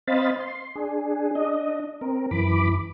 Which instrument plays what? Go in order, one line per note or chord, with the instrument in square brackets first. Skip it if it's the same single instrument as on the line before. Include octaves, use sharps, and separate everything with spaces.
[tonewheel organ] C4 C5 D#5 F5 B5 A6
C6
D4 G#4
D4 D#5
C4 A#4
F#2 E3 B5 D6